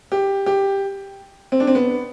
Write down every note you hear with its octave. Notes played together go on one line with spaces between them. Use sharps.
G4
G4
C4
D4
C4
B3